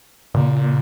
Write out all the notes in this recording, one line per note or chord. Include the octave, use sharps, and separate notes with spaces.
A#2 C#3